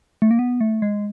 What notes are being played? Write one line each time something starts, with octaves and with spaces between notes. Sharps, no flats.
A3
A#3
B3
A3
G#3